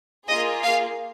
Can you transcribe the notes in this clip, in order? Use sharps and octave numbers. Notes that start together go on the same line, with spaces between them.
A#3 F4 G#4 D#5
F5